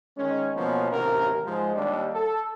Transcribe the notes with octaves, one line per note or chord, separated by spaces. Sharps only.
D#3 G#3 C#4
B2 F3 A#3 B3 C#4
A1 D#2 C3 A#4
G#2 F3 G#3
D#2 G3 D4
A4